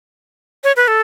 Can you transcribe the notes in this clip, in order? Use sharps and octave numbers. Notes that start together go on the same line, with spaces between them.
C#5
B4
A4